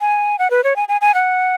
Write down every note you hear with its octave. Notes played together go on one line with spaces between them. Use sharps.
G#5
F#5
B4
C#5
G#5
G#5
G#5
F#5